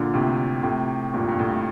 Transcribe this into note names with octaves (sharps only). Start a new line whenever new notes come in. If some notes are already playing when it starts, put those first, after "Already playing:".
Already playing: A#2 D3
A2 C3
A2 C3
G2 A#2
G2
A2